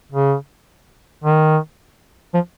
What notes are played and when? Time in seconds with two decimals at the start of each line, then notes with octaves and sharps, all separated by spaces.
0.12 C#3
1.24 D#3
2.34 F3